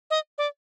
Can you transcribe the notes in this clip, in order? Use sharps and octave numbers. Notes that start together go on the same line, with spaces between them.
D#5
D5